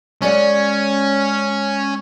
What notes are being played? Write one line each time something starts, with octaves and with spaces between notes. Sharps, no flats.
G#3 C#4 D5 F#5